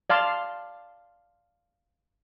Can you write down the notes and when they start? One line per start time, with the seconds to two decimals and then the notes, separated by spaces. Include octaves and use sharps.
0.10 D5 F5 A5 C6